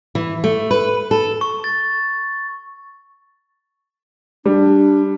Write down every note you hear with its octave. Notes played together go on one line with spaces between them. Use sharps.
E3
A3
B4
A4
C#6
A6
G3 D4